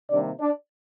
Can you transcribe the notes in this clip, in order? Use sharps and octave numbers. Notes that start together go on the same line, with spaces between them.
C3 D#3 G3 A#3 D4 D5
D4 D5